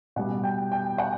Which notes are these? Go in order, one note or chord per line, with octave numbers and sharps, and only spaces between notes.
B2 G3 F#5
G5
G5
F#5